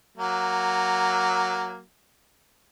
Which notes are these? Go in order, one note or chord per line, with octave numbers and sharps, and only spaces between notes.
F#3 A#3